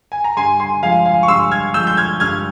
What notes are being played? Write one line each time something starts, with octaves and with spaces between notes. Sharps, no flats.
G#5
A#5
G2 G#5 C6
G#5 C6
F3 G#3 F5 G#5
F5 G#5
C#6
G2 C6 E6
F6 G#6
F3 G#3 E6 G6
G6
F6 G#6
G2 F6 G#6